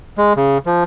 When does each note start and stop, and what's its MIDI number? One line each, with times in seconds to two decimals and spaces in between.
0.18 0.33 56
0.37 0.58 49
0.66 0.84 53